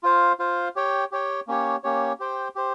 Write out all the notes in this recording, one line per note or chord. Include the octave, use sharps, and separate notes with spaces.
F4 C5 F5
F4 C5 F5
G4 C#5 G5
G4 C#5 G5
A#3 C#4 G4 C#5
A#3 C#4 G4 C#5
G4 C5 G5
G4 C5